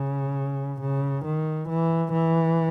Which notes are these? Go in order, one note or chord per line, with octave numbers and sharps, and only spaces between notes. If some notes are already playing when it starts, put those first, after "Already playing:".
Already playing: C#3
C#3
D#3
E3
E3